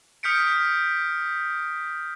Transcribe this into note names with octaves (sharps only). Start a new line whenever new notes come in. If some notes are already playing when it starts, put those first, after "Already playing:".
D#6 F6 G6 B6 C#7 D7